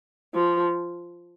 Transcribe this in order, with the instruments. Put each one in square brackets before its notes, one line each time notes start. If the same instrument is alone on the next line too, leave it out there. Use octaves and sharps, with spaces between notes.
[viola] F3